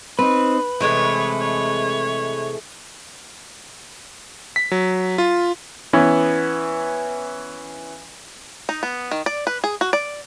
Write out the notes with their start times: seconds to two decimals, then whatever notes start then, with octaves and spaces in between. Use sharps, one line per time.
0.19 C4 D#4 B4
0.80 C3 E3 G#3 A3 C#5
1.40 C#5
4.56 B6
4.71 F#3
5.18 F4
5.93 E3 B3 C#4
8.69 D#4
8.83 B3
9.11 D#3
9.26 D5
9.47 B4
9.64 G#4
9.81 F#4
9.93 D5